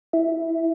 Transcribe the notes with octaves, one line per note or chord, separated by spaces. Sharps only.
E4